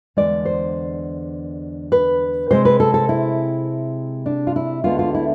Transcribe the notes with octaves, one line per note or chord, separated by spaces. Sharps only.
E2 D3 G#3 D5
C5
B4
C3 G#3 C4 C5
B4
A4
A4
E4
D4
F4
E4
D2 D3 G#3 B3 F4
F4
E4